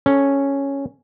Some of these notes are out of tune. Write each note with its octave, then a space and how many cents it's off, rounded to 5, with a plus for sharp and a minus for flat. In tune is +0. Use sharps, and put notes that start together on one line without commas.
C#4 +0 A4 +0